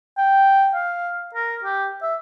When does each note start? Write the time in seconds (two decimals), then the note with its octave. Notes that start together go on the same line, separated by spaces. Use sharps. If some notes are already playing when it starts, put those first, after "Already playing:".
0.18 G5
0.74 F5
1.34 A#4
1.64 G4
2.02 E5